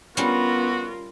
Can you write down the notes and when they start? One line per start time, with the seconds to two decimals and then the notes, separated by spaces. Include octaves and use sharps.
0.17 G3 B3 C#4 F4 F#4 A#4